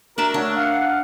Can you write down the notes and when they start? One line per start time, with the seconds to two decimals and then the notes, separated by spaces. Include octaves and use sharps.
0.18 D4 F#4 A#4 D5 E5 A#5
0.34 A3 D4 C#5 F#5
0.57 F5 F#5